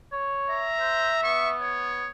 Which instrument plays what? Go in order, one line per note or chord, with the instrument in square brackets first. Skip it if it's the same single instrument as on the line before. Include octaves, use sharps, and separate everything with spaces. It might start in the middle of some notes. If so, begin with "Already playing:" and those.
[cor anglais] C#5
[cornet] E5 [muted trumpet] A#5
[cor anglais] C5
[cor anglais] B3 [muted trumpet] C#6
[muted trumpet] C#5